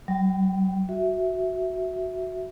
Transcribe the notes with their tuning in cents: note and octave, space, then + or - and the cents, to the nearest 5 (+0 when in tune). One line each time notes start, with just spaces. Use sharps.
F#3 +40 G5 -5
F#4 +0 E5 -5